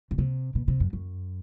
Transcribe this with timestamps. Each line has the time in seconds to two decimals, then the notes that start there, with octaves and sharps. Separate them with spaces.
0.11 C#3
0.18 C3
0.55 B2
0.68 C3
0.80 F#2
0.93 F#2